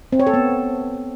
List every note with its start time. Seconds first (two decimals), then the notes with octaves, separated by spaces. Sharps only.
0.12 C4
0.20 C#5
0.27 A4
0.34 B3